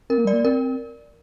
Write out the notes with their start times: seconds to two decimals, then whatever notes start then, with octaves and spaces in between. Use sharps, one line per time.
0.10 C4 A#4
0.18 A#3
0.25 G3 D5
0.33 A#3
0.45 C4 A#4